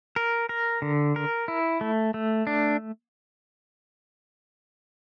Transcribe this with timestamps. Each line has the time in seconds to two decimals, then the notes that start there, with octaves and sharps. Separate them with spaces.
0.16 A#4
0.49 A#4
0.82 D3
1.16 A#4
1.48 E4
1.81 A3
2.14 A3
2.47 D4